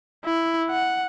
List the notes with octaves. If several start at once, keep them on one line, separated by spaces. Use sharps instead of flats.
E4
F#5